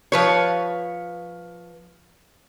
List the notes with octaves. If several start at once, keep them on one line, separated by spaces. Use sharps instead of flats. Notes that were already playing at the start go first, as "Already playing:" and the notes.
F3 B4 C#5